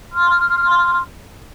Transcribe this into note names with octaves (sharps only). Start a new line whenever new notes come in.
C6 F6